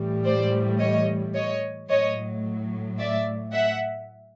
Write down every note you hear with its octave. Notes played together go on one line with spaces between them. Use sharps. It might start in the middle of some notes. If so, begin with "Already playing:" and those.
Already playing: A2 E3 G3
C5 D5
C#5 D#5
C#5 D#5
A2 F#3 C#5 D#5
D5 E5
E5 F#5